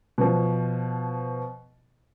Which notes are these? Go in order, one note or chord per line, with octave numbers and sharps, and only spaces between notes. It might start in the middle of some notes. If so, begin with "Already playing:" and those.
B2 F3